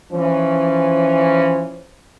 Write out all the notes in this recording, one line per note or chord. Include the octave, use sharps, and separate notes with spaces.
E3 F3 C#4